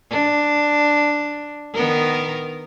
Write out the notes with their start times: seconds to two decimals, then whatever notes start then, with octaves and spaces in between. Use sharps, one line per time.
0.10 D4
1.74 D#3 B3 A#4